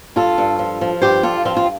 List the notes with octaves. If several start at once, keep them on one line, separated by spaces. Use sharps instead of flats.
G2 F4 A4
G2
F3
F3
G2 G4 C5
G2 F4 A4
F3 C4 F4
F4